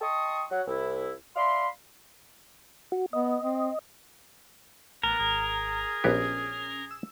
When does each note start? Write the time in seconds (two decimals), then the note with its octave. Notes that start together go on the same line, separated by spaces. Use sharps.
0.01 D#5 G5 A5 C6 C#6 D#6
0.51 F#3 F#5
0.67 C2 E4
1.36 D5 E5 F5 B5 C6
2.92 F#4
3.13 B3 D#5
3.42 C4
5.03 A1 B3 A#4
5.20 G#1 G#4
6.04 A#1 B3 C#4 G4
6.91 E6